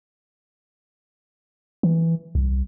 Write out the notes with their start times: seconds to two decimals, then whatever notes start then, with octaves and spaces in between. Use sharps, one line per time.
1.83 E3
2.35 C2